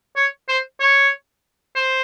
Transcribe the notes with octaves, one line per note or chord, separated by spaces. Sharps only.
C#5
C5
C#5
C5